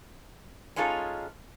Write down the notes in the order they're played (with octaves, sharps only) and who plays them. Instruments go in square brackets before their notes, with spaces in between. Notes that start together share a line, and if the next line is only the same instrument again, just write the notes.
[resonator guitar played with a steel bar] G#3 C#4 D#4 F4 A4